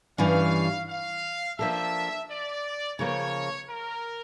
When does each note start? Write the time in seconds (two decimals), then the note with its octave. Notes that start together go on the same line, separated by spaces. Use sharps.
0.18 G2 E3 G3 C#4 F5
0.89 F5
1.59 F3 A#3 D4 A4 E5
2.29 D5
2.99 C#3 F3 A#3 C#5
3.69 A#4